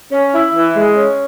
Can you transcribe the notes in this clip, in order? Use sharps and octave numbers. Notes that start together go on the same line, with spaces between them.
C#4
E4
E3
G#3
C#4